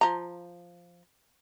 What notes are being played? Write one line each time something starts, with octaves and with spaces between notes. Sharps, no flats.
F3 A#5